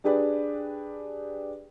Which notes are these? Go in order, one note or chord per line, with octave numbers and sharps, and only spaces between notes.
D4 G4 G#4 B4 D5